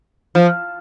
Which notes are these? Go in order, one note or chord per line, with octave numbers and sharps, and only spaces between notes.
F3